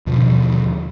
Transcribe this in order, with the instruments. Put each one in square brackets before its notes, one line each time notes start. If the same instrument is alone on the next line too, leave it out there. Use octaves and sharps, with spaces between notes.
[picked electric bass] D#2 B2 D3 F3